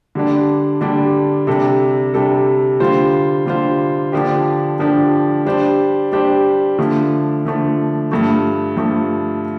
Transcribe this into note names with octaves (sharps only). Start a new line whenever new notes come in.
D3 G3 D4
D3 G3 D4
C3 G3 D4 A4
C3 G3 D4 A4
D3 G3 F4 C5
D3 G3 F4 C5
D3 F3 D4 G4
D3 F3 D4 G4
G3 D4 G4 C5
G3 D4 G4 C5
D3 F3 A3
D3 F3 A3
G2 F3 A3
G2 F3 A3